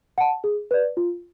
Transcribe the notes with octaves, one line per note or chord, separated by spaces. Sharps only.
F#5 A5
G#4
B4 D5
F4